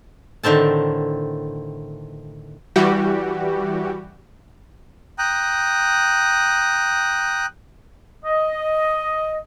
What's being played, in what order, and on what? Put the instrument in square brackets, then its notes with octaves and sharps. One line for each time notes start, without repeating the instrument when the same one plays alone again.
[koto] A2 D3 D#3 C4 A5
[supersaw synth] E3 G3 F#4 G4
[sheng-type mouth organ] G5 A#5 D#6 F#6
[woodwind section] D#5